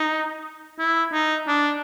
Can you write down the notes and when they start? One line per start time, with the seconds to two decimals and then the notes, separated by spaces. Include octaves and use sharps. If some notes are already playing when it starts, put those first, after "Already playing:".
Already playing: D#4
0.79 E4
1.13 D#4
1.47 D4